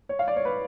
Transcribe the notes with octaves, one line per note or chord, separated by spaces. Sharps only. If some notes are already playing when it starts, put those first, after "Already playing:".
C#5
F5
D5
C#5
B4